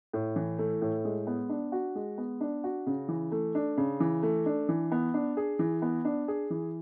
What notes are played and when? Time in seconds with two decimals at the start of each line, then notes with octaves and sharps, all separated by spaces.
0.13 A2
0.36 E3
0.59 A3
0.82 A2
1.05 G#3
1.27 B3
1.49 D4
1.72 F#4
1.95 G#3
2.18 B3
2.41 D4
2.64 F#4
2.86 C#3
3.08 E3
3.32 A3
3.55 D4
3.77 C#3
4.00 E3
4.23 A3
4.46 D4
4.69 E3
4.92 B3
5.14 D4
5.37 G#4
5.59 E3
5.82 B3
6.05 D4
6.28 G#4
6.50 E3